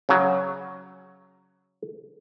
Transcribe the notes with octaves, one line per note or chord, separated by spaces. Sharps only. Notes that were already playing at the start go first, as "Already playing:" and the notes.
C#3 F#3